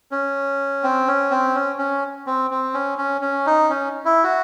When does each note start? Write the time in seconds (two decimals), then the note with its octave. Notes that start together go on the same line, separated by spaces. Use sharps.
0.11 C#4
0.83 C4
1.08 C#4
1.31 C4
1.55 C#4
1.79 C#4
2.27 C4
2.51 C4
2.74 C#4
2.98 C#4
3.21 C#4
3.46 D#4
3.70 C#4
4.05 E4
4.24 F#4